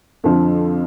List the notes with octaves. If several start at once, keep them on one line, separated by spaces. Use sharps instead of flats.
F2 D3 F3